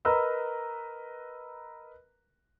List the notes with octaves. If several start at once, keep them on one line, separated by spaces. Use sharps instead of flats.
A#4 B4 D#5 A#5 B5 E6